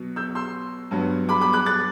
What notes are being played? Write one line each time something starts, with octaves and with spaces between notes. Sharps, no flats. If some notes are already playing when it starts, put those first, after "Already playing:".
Already playing: B2 F#3 B3
E6 G6
C6 E6
G2 F#3 B3
B5 D6
B5 D6
D6 F#6
F#6 A6